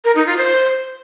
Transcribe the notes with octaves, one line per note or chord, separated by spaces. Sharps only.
A#4
D#4
F4
C5